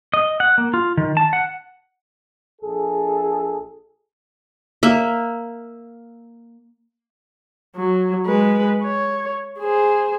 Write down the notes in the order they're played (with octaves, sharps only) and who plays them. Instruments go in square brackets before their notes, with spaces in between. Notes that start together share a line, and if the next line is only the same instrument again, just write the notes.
[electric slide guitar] D#5
F#5
A#3
F4
D#3
A5
F#5
[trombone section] A#1 G#4 A4
[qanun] A#3 E5
[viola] F#3
G#3 B4
C#5
G#4 C5